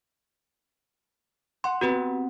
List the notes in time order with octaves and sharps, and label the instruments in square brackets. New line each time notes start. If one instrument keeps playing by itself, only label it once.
[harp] F#5 [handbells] C6
[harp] B3 C4 [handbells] F#4 G4 B4